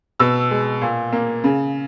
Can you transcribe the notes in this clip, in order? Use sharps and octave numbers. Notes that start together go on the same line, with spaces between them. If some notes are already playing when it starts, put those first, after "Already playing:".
B2 E6
G#3
A#2
A#3
C#3